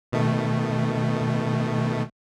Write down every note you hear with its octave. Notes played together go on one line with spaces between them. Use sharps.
B2 D#3 A3